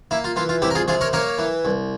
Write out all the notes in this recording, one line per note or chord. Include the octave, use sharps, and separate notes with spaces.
A#3 E4
F4
E3 F4
F4
C2 E4 G4
A#4
F4 G#4
C3 F4 G#4
A#4 C#5
A#3 A#4 C#5
E3
C2